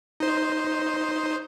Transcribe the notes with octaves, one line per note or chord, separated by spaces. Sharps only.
D#4 C5